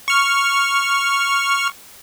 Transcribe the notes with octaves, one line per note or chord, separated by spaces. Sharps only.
C#6 F6